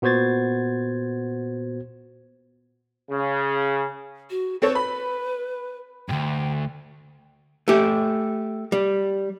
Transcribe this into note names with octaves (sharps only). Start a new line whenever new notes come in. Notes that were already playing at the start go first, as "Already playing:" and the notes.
A#2 B3 F#4 C5 G#6 A6
C#3
F#4
C4 A4 B4 C#5
B5
D2 G2 G5
A3 G4
G3